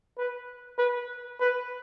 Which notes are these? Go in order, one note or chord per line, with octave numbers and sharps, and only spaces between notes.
B4
B4
B4